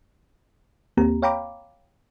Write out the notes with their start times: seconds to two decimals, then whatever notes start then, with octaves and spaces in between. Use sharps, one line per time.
0.97 D#2 A#3 C4 G4 A#5
1.22 C#5 F5 G5 A#5 B5 D6